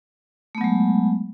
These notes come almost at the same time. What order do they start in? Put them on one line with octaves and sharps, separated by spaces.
A3 B3 F#3 G#3